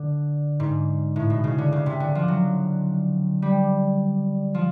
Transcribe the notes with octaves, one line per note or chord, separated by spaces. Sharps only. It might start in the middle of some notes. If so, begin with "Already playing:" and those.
Already playing: D3
G#2
A2
B2
C#3
D3
C#3
C3
D3
F3
F#3
G3
F3